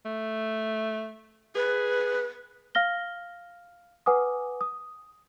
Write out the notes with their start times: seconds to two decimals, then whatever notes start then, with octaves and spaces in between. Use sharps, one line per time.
0.06 A3
1.55 G#4 B4
2.75 F5 F6 A#6 G7
4.06 B4 F#5 G#5 D6 D#6
4.61 D#6